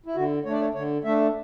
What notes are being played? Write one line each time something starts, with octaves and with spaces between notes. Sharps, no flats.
E4
D3 F#4
A3 D4 C#5 D5
C#5
D3 C#5
A3 D4 E5